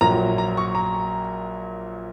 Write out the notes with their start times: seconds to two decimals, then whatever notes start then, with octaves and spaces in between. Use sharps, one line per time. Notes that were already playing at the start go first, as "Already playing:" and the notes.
0.01 A#1 A#2 F#3 A#5
0.38 A#5
0.57 C#6
0.75 A#5